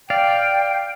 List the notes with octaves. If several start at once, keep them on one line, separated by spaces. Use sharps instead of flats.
D5 F5 G5